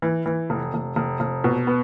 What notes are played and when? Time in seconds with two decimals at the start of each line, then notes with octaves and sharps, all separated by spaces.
0.02 E3
0.26 E3
0.50 F1
0.74 F1
0.96 F1
1.20 F1
1.44 B2
1.67 B3